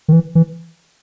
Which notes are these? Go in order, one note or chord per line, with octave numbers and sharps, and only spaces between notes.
D#3
E3
E3